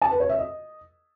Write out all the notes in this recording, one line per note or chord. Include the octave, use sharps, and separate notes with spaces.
A5
B4
C#5
E5
D#5